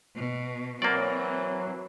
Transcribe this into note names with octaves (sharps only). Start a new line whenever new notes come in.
B2
E3 F#3 A#3 C4 D5